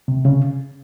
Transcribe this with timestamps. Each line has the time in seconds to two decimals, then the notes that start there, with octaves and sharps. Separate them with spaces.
0.08 C3
0.25 C#3